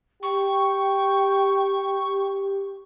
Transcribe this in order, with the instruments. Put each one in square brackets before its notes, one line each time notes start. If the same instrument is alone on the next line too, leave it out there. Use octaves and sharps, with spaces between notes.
[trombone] G4 [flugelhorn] G5 [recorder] C#6